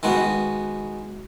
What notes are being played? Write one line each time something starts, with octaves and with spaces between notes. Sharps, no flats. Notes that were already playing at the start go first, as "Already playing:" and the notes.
D#3 G#3 B3 F#4